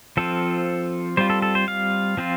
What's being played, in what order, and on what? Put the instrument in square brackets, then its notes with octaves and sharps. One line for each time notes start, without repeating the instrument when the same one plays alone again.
[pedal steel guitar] F3 C4 F4 A4
G3 C4 F4 C5
A4
A4
C5
F5
F3 C4 F4